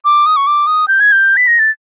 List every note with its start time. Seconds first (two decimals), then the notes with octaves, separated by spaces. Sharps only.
0.05 D6
0.26 D#6
0.36 C#6
0.47 D6
0.67 D#6
0.88 G6
1.00 G#6
1.12 G6
1.37 B6
1.47 A#6
1.59 A6